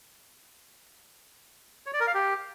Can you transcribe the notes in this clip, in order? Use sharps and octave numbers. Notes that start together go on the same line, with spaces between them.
C#5
D5
A#4
F5
G4